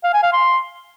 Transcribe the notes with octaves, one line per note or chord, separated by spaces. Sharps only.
F5
G#5
F5
C6